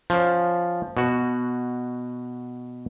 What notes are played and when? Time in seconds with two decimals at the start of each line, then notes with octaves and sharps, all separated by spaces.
0.10 F3 C#4
0.97 B2 F#4